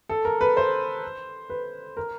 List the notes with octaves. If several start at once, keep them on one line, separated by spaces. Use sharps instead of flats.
A4
A#4
B4
C5
B4
A#4